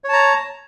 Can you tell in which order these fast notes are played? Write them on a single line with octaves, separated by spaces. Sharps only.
C#5 A5 A#5